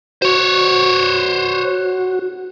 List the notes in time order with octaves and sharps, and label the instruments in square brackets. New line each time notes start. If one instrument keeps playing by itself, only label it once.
[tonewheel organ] F#4 [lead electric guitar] C5 C#5